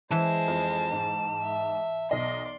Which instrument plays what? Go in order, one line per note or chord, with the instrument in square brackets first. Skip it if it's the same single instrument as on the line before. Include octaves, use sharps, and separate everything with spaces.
[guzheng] E3 [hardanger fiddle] G#3 C5 [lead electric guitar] A5
[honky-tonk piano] F2
G#2
[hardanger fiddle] E5
[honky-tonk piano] B1 D#5 [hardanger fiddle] D5 C6